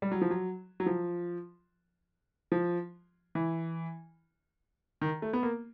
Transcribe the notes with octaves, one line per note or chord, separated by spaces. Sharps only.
G3
F#3
F3
F#3
F#3
F3
F3
E3
D#3
A3
B3
A#3